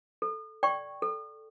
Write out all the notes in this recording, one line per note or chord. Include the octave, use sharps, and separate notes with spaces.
A4
D5 G5 C#6
A4